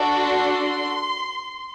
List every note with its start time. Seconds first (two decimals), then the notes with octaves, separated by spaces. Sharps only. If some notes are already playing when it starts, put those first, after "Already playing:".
Already playing: D4 F#4 A4
0.23 C6